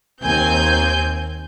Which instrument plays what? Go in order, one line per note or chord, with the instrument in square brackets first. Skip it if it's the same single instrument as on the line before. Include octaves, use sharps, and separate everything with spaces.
[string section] D#2 C4 G#5 G6